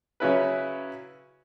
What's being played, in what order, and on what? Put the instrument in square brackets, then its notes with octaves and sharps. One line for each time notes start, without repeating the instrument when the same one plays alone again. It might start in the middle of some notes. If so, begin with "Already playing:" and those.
[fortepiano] C#3 F#3 C#4 E4 B4